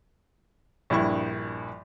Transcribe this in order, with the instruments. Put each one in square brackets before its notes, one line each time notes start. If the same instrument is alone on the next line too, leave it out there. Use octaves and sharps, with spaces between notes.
[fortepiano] A#1 G2 E4 C#6